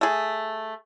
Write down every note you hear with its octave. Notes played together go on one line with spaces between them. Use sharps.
A3 G#4